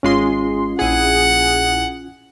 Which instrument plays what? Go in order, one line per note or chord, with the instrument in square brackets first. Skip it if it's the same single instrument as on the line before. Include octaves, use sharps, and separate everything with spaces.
[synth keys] G#1 G#3 C6 [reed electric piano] C#4 F4
[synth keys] A#1 E4 G#4 [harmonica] F#5